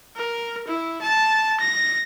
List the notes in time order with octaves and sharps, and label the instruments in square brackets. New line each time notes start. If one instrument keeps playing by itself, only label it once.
[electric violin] A#4
E4
A5
A#6